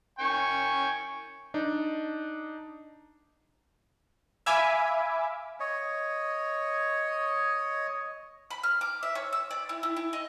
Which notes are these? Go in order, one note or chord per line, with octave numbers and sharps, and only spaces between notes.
G5 G#5 C#6
D4 D#4
E5 F5 G#5 B5 D6
C#5 D#5
B5
F6
D6
E5
C#5
E6
D5
E4
E4
E4
D#5